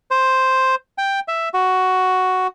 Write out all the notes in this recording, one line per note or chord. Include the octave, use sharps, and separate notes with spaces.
C5
G5
E5
F#4